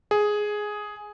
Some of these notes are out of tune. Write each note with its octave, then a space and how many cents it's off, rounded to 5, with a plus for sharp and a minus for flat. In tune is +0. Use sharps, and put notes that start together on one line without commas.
G#4 +5